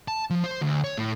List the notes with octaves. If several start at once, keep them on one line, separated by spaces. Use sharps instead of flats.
A5
F3
C5
D2
C#5
A2